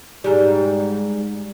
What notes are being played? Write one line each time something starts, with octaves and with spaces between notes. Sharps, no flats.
G#2 G3